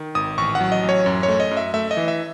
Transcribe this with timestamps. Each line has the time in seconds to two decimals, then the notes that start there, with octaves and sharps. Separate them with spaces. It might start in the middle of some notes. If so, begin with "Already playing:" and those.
Already playing: D#3
0.15 G#1 D#6
0.38 A1 C#6
0.55 F#5
0.61 F#3
0.72 D#5
0.83 A1
0.89 C#5
1.06 F#2
1.23 C#5
1.28 A3
1.40 D#5
1.51 F#2
1.57 E5
1.74 A3 E5
1.91 D#5
1.97 E3
2.08 E5